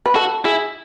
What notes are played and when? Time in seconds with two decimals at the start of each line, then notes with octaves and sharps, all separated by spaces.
0.06 B4
0.15 F#4 A4
0.45 E4 G#4